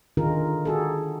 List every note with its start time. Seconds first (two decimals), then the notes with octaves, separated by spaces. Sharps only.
0.17 D3 D#3 D#4 F4 G#4 A#4
0.65 F#4 G#4 A4